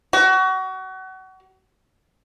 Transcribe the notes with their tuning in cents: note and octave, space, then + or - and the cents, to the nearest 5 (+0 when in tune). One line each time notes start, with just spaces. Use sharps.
F#4 +30